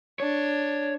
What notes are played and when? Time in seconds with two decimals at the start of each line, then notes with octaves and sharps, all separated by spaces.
0.20 D4 C#5